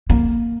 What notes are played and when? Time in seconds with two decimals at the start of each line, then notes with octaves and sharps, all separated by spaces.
0.10 A#3